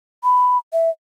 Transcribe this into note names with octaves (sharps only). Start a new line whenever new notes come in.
B5
E5